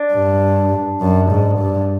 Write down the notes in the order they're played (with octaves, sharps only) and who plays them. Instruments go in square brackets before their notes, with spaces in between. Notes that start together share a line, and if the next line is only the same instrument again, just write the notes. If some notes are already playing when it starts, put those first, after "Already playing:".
Already playing: [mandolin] D4
[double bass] G2
F#2
G#2
G2